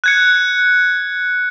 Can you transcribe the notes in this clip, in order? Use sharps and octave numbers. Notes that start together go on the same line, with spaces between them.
F#6 G#6 C#7